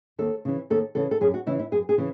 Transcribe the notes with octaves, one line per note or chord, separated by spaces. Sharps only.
D#2 A4
C#3 E3
D#2 A4
C#3 E3 A4
A4
F#2 G#4
F#4
C#3 E3 E4
E4
F#2 G#4
G#4
C#3 E3